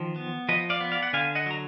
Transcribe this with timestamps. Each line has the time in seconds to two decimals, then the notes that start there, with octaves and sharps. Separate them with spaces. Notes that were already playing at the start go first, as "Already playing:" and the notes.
Already playing: D#3 F3
0.16 B3
0.49 F3 B4 D#5
0.70 D5 F5
0.81 B3
0.92 D5 F5
1.03 F#5
1.13 D3 F5 G#5
1.35 D#5 F#5
1.46 F#3 A#5